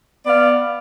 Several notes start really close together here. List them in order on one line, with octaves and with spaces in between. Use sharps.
D5 B3 F5